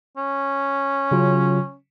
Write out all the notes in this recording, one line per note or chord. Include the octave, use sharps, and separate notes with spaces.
C#4
C#3 F#3 F4